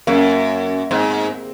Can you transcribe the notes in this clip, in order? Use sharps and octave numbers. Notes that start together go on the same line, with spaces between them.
F#2 A#3
G#2 C4